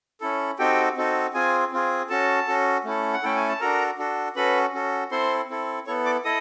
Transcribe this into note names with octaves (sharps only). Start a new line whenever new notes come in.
C#4 E4 A4
C4 D#4 F#4 G4 A4 G5
C4 D#4 F#4 A4
C4 F4 G#4 G#5
C4 F4 G#4
C#4 F#4 A4 A5
C#4 F#4 A4
A3 C#4 E4 A4
F#5
A3 C#4 E4 A4 G5
G#5
A5
D4 F#4 A4 A#4 A#5
D4 F#4 A4
C#4 F#4 A4 B4 B5
C#4 F#4 A4
C4 E4 A4 C5 C6
C4 E4 A4
B3 E4 A4 C#5 C#6
D5 D6
E4 A4 D#5 D#6